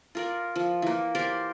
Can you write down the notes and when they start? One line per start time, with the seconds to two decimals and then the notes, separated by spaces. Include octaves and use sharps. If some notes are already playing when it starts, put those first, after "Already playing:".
0.15 F4 A#4 D5
0.56 F3
0.82 E3 A#3
1.15 G4 A#4 C5 D5